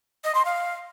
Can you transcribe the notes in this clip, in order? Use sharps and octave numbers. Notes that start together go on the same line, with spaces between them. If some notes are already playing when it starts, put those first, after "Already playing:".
D#5
C6
F5